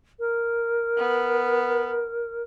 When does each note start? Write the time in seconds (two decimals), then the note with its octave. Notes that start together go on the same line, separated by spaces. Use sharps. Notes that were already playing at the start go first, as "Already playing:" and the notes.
0.19 A#4
0.98 B3